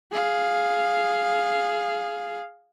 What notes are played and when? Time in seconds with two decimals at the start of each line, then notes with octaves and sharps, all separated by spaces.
0.12 G#4 F5